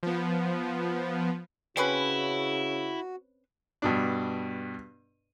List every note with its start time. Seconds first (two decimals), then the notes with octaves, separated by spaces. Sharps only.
0.03 F3 B3
1.77 C#3 C4 C#4 E4 F#4 B4
3.82 G2 B2 D4